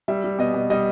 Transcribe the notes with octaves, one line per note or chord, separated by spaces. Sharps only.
G3 E5
G3
B2 D#5
B2
G3 D#5